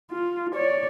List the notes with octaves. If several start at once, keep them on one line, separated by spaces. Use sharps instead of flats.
F4
C#5 D5